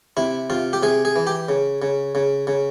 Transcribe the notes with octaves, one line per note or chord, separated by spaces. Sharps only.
C3 E4
C3 F4
G4
C3 G#4
G#4
E3
G4
C#3
C#3
C#3
C#3